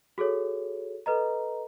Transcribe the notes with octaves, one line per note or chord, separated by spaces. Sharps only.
F#4 G#4 A4 C#5
A4 B4 D#5 A#5